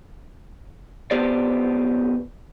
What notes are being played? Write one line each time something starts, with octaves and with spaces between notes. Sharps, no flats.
B1 F2 B3 G4 C5 D5